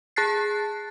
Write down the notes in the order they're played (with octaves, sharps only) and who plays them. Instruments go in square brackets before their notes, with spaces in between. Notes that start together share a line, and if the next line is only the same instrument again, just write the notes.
[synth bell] G#4 A5 F#6 A6 C7